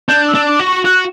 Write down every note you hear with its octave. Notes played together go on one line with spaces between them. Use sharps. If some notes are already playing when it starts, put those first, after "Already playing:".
D4 G6
E6
D4
D6
F#4
C#6
F#4 F#6